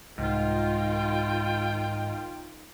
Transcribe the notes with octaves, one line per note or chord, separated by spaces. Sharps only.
C2 G#2 D#3 F4 G5